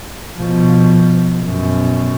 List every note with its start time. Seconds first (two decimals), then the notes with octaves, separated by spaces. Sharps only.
0.37 B2 F3
1.41 F#2 B2